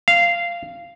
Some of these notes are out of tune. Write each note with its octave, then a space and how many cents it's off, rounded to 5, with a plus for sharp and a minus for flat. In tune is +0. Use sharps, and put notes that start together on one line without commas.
F5 -15